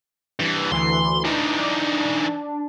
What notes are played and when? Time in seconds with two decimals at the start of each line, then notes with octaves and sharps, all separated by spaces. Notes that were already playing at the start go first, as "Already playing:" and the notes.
0.40 G2 E3
0.72 D2 E3 C6
1.24 E3 D4 D#4